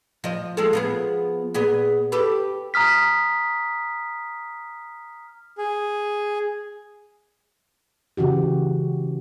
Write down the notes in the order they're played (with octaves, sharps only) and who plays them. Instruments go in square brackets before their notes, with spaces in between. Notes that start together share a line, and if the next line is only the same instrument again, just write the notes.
[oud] F3 D#5
G#3 F4 A4
F3 B3 G#4
A#2 B3 G#4
G4 A4 B4
[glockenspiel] A#5 D#6 F6 B6
[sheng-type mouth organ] G#4
[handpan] C#3 E3 F#4 G4